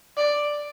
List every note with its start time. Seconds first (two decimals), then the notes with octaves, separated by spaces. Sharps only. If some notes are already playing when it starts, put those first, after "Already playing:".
0.17 D5